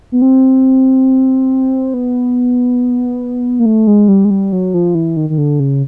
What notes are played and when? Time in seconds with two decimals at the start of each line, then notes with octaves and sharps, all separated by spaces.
0.12 B3
0.22 C4
1.94 B3
3.59 A#3
3.66 A3
3.87 G#3
4.08 G3
4.25 G#3
4.30 G3
4.52 F#3
4.74 F3
4.95 E3
5.17 D#3
5.30 D#3
5.38 D3
5.60 C#3